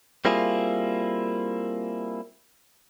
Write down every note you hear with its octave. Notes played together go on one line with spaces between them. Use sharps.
G3 A#3 C4 E4 F4 G#4